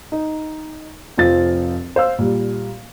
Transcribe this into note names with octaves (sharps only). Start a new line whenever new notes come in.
D#4
F1 F3 C4 F4 A6
C5 F5 E6
A#2 G3